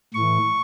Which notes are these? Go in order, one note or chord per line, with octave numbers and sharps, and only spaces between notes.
A2 E3 C#6